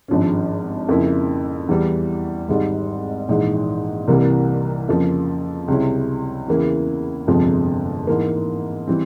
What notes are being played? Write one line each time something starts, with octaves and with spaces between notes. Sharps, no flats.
G#1 G2 F3 G#3 C#4
F2 C#3 F3 A#3 E4
E2 E3 G3
G#1 G#2 G3
A#1 G#2 E3 G#3
C2 C3 E3 G3 A#3
F2 C#3 F3 A#3
C#2 C3 G3 C#4 E4
E2 C#3 E3 A#3 E4
G1 F2 C3 F3 G#3
G#2 E3 A#3
E3 G3 C4